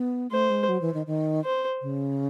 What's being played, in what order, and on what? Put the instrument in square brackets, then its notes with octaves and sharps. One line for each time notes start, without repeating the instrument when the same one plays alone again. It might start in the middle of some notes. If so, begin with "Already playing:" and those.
Already playing: [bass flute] B3
[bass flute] A3 [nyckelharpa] C5
[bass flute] G#3
F#3
E3
D#3
D#3
[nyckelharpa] C5
[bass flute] C#3